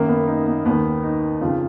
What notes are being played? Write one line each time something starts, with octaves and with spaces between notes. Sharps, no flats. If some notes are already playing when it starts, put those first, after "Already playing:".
Already playing: F#2 D#3 A#3
B3
D#4
B3
D#2 D#3 B3
D#4
F2 C#3 F4